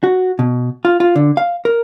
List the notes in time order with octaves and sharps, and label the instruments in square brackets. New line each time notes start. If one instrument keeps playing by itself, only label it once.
[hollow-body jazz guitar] F#4
B2
F4
F4
D3
F5
A#4